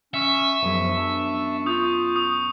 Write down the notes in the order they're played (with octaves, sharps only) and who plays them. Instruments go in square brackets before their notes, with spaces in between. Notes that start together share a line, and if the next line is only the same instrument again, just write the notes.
[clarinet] C#4 [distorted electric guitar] E5 [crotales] C#6 C#7
[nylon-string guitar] F#2 B2 G#3 [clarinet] F3
[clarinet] D4
[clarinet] F4 [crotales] C#6 D#6 G6
[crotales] D#6